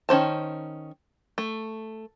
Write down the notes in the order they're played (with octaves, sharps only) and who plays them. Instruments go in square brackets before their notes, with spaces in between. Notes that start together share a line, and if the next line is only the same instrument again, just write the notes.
[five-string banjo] D#3 C#4 C5 A5
A3